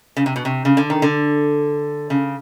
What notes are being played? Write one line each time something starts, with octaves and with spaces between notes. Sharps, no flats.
C#3
C3
B2
C3
C#3
D3
D#3
D3
C#3